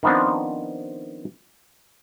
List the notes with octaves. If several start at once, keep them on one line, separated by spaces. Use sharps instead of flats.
D#3 F3 B3 C4 D4